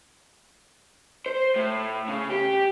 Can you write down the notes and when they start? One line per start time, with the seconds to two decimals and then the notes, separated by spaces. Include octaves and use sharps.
1.26 C5
1.56 A2
2.08 C#3
2.30 G4